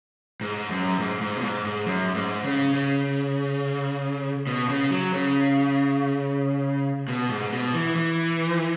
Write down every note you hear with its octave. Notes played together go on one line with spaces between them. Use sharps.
G#2
F#2
G#2
G#2
B2
G#2
G#2
F#2
G#2
C#3
C#3
B2
C#3
F#3
C#3
B2
G#2
B2
E3
E3